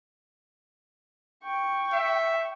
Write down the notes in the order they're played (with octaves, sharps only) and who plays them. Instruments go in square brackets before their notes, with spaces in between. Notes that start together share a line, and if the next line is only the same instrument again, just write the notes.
[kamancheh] G5 C#6
[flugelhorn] E5